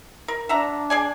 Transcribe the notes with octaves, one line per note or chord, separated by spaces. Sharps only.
A#4
D4 E5 F#5 A#5
G#4 D5 G#5